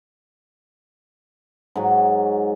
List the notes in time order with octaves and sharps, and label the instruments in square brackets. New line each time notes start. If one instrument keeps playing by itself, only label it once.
[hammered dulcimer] G#2 F#3